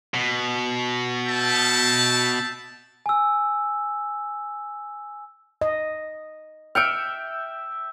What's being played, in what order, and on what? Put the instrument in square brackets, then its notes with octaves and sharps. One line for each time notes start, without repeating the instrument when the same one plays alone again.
[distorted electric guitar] B2
[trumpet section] E5 G5 A5
[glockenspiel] G#5 E6
[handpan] D#5
[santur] E5 G5 [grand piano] F6 C#7 D7